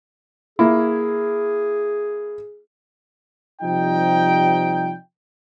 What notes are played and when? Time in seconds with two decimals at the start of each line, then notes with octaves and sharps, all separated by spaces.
0.59 A#3 E4 G#4
3.62 C3 F3 G3 D#4 G5